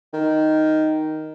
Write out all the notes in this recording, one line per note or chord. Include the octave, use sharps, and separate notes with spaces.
D#3